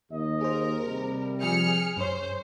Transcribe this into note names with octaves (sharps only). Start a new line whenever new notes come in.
D#2 A#3 D#5
G#4 A#4 C5
C3 G3
F3 G#4 F6 G6 C#7
F#2 C5 C#5